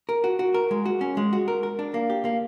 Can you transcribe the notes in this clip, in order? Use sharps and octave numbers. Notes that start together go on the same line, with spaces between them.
A#4
F#4
F#4
A#4
G#3
F#4
C#4
G#3
F#4
A#4
A#4
D4
A#3
G4
A#3